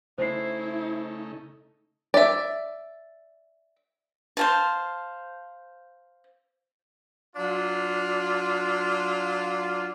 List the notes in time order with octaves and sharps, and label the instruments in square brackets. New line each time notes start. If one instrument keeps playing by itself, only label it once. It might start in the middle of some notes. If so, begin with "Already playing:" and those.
[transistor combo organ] C#3 A3 D#4 [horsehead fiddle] E4 [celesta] C5 C7
[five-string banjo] D5 E5
[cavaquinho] C5 F5 A5
[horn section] F#3 D4 F4